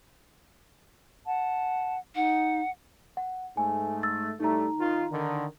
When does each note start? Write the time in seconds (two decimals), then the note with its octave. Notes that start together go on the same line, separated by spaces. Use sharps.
1.26 F#5 A5
2.15 D#4 F#5
3.17 F#5
3.57 G#2 A3 G#5
4.03 E6 A6
4.40 A2 G3 A3 D#4 A#5
4.79 D#3 F4
5.11 D3 D#3